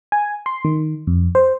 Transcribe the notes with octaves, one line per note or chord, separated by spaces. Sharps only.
G#5
C6
D#3
F2
C5